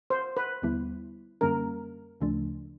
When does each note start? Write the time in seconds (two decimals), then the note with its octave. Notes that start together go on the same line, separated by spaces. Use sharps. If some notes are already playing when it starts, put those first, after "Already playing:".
0.10 C5
0.37 B4
0.62 D#2 D3 G3 B3 E4
1.41 F#2 D3 G3 A#3 C#4 A#4
2.21 D2 C#3 F3 A3 D4